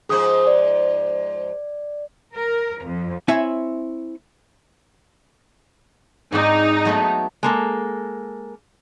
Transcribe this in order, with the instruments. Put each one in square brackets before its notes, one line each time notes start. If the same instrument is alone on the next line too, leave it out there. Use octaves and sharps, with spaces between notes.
[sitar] G#2 F3 C5 [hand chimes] G#4 D#6
[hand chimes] D5
[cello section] A#4
F2
[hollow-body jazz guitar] C4 E4 C#5 E5 G#5
[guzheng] G#2 C4 D5 [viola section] D#4
[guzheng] F#3 A3 B3
[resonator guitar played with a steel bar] G#3 A#3 A4